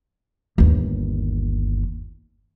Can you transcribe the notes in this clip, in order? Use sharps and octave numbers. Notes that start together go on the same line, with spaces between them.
G1 D#2